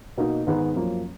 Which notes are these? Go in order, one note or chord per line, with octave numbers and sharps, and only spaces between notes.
B2 A#3 D#4 F#4
G#2 D#3 G#3 B3 D#4
F#2 F3 A#3 C#4